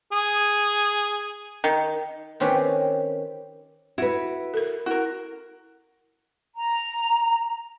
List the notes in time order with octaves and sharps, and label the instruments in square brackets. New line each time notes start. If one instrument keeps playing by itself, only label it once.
[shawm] G#4
[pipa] D#3
[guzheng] D#3 C4 C#4 G4 B4
[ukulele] E4 [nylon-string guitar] F#4 B4
[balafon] A4 A#4
[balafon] E4 [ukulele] F#4 A#4
[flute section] A#5